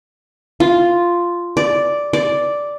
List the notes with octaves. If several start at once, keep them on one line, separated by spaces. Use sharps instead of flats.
F4
D5
D5